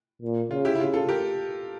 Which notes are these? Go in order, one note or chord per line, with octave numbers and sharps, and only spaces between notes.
A#2
C#3 F4
E4 G4
E4
C#3 F4
F4 A4
G4 A#4